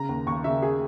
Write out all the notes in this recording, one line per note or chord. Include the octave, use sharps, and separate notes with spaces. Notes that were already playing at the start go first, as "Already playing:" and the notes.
Already playing: C#3 A#5
D#2
D#2 C#6
C#3 E5
G#4